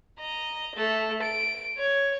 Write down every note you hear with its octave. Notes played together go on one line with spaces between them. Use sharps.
D#5 A#5
A3 A4
D7
C#5